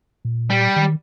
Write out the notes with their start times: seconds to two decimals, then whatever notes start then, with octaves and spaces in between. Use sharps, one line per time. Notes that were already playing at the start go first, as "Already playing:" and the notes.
0.25 A#2
0.50 G3
0.76 D#3